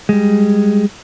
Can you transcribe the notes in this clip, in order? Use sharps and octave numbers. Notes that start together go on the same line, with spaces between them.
G3 G#3